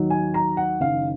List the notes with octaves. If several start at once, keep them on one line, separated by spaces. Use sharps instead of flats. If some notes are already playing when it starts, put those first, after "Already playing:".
Already playing: D#2 D#3 F#3
G#5
A#5
F#5
F#1 F#2 D#3 F5